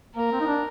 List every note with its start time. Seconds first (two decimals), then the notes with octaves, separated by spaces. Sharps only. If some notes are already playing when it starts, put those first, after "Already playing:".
0.15 A#3 A#4
0.32 C4
0.40 D#4
0.47 D4